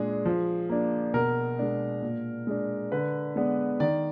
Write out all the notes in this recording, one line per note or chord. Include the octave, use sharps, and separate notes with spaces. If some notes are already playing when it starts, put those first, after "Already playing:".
Already playing: A#2 G#3 D4 G#4
F3
A#3 D4
B2 A#4
G#3 D4
A#2
G#3 D4
D3 B4
G#3 B3 D4
D#3 D5